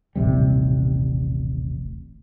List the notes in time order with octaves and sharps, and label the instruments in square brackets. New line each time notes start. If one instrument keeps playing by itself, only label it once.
[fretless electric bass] D#1 A1 C3 G3